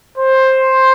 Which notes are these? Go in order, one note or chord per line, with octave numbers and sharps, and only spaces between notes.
C5